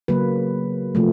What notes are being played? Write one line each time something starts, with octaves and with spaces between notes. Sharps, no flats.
C#3 F#3 A#3 B4
C3 F3 A3